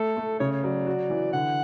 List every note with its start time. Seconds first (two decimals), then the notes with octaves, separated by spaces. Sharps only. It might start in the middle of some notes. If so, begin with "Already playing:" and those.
Already playing: A3 A4
0.17 A3
0.40 C#3 C#5
0.52 C#5
0.63 F#3 D5
0.87 F#4
1.10 E3
1.33 D3 F#5